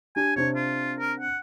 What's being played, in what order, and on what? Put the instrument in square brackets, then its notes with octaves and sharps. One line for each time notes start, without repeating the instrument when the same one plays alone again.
[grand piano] D4 G4 [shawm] G#5
[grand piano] C3 C4 D4 [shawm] C#5
[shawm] F4
A#4
F#5